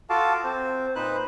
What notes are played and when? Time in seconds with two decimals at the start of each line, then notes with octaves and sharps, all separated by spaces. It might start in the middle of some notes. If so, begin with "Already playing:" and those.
0.10 F4 F#4 A4 F5 A5 D6
0.44 C4 C5
0.95 A#2 D#4 B4 C5 F#6